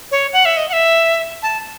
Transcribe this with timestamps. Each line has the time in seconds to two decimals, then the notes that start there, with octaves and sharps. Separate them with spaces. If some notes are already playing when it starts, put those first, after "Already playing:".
0.11 C#5
0.33 F#5
0.45 E5
0.57 D#5
0.69 F#5
0.73 E5
1.43 A5